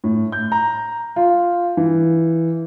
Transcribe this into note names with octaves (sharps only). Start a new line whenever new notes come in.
A2
G6
A#5
F4
E3